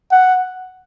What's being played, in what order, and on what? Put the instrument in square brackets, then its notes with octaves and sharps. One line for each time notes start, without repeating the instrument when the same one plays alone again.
[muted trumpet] F#5